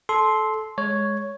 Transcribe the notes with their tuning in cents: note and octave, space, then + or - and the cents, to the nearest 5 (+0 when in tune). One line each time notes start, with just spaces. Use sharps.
A4 -20 C6 +0
G#3 +0 C#5 +0